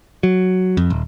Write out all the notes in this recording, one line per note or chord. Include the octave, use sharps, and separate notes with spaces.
F#3
F2
D#1